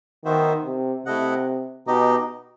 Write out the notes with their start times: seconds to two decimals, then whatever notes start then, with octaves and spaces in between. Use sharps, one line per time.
0.25 D#3 B3 F#4 C5 E5
0.65 C3
1.06 C3 A3 E4 A4 D#5 F#5
1.87 B2 D#4 G4 D#5